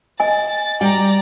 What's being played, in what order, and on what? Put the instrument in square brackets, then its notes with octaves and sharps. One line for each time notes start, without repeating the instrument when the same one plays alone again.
[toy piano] D#5 G#5 [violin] A6
[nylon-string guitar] G3 G5 [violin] D5 A#5